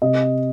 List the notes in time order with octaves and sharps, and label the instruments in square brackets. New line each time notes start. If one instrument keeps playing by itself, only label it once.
[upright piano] C3 D#5